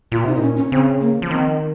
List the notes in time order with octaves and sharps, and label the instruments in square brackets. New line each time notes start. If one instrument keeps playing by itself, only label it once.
[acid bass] A#2 [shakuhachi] F4
[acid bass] C3 [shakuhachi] D#4
[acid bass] A#2 [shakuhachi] D#4
[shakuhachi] C#4
C#4
[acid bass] C#3 [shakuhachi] C4
[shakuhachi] A#3
[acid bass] F3
[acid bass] D#3 [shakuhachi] C4